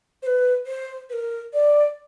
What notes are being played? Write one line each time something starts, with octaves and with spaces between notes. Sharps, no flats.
C5
B4
C5
B4
A#4
D5